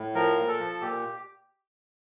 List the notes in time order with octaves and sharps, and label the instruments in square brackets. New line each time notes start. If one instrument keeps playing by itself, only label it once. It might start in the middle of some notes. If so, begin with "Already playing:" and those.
Already playing: [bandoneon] A2
F3 A#4
A#2
A4
F3
A#2 G4